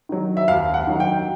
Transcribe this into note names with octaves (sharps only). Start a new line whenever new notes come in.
D#3 F#3
E5
D#2 F5
F#5
D#3 F#3
G5